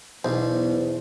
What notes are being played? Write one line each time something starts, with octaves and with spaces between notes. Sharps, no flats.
B1 E2 C5